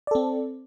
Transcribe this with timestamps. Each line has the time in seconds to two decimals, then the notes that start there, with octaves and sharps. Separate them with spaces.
0.07 D5
0.11 A4
0.15 C4